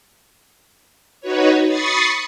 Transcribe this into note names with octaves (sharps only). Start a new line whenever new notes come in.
D#4 F#4 B4 C#5
B5 C#6 D#6 A6 C7 C#7